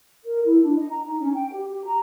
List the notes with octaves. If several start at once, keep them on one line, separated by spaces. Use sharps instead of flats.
A#4
E4
D4
D#5
A#5
D#4
C#4
G5
G4
G4
A#5